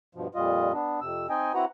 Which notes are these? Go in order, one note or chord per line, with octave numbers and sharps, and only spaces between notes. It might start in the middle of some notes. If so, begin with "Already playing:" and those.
G2 B2 F3
F2 A#2 G3 F4 D#5
B3 D4
F2 C3 E6
C4 D#4 D#5 G5 G#5
C4 E4 F#4 B4 F#5 A#5